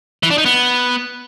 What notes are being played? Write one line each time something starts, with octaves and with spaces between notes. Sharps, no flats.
E3
D4
D#4
B3